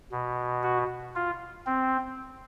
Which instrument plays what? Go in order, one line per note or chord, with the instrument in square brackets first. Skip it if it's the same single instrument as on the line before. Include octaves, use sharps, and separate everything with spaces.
[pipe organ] B2
F#4
F4
C4